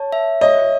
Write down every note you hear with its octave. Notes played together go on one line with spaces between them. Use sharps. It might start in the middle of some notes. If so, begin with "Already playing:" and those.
Already playing: C#5 A5
E5
C#5 D#5